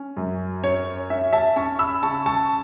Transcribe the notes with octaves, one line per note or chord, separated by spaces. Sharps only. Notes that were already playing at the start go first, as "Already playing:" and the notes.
Already playing: C#4
F#2
C#4 C#5
C#4 E5
E5 A5
C#4 A5 C#6
B5 E6
C#3 A5 C#6
A5 C#6